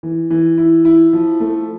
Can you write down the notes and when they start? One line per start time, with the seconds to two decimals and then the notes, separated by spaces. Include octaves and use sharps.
0.03 E3
0.30 E3
0.58 E4
0.85 E4
1.13 F3
1.40 A3